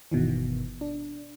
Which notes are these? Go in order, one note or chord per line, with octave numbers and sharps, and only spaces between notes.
G1 B2 D#3 E3
D4